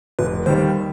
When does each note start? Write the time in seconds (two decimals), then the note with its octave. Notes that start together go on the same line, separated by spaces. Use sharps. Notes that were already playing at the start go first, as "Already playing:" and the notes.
0.19 F1 B4
0.46 D#2 D#3 G3 C5